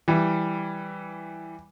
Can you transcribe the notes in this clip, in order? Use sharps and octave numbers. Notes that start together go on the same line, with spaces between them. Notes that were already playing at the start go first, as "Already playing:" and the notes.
E3 G3